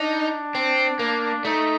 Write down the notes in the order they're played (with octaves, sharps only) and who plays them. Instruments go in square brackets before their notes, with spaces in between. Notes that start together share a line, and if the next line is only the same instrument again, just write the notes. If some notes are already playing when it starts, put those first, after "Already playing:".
Already playing: [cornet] D4 [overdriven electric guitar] D#4
[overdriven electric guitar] C4
A#3
[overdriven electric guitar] A3 [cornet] D#4